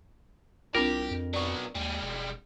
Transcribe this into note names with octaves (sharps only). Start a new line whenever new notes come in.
C2 C4 D4 F4 G4 A#4
F2
F#3 B3 D5 C#6
D#2 G3 G#3
E1